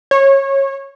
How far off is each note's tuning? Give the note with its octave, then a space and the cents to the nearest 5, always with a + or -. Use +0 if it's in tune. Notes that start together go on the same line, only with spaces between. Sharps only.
C#5 -20